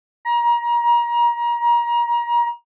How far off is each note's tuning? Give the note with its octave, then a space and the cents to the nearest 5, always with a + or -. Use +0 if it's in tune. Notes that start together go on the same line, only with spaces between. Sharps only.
A#5 +30